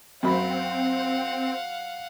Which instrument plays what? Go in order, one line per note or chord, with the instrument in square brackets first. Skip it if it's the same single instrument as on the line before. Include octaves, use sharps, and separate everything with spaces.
[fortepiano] F#2 B5 [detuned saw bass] C4 [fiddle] F5 F#5